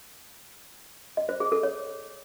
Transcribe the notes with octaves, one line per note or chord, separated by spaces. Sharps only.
D#5
C5
G#4
A4
C#5